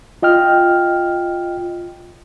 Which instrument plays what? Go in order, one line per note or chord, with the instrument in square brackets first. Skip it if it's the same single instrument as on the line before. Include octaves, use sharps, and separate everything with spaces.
[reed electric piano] F4 D#5 G5 F6